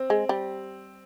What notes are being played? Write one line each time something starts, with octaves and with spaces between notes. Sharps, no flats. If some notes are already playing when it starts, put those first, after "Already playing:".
Already playing: C4
G#3
G3